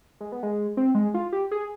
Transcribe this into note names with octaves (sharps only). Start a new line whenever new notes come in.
G#3
B3
G#3
C4
G#3
F4
G4
G#4